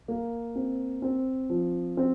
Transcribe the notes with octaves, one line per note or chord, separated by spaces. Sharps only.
A#3
C4
C4
F3
C4